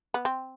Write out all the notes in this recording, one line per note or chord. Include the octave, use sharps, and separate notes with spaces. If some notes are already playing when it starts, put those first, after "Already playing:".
B3
C4